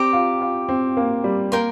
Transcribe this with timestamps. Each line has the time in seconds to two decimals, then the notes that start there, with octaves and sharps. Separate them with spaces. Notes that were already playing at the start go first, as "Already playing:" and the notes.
Already playing: C4 G4 D5 A#5 D6
0.13 F4
0.42 F4
0.69 C4
0.97 A#3
1.24 G3
1.52 A#3 A#4 G5 C6